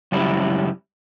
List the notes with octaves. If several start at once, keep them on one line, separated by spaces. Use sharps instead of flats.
C#2 F#2 G3 E4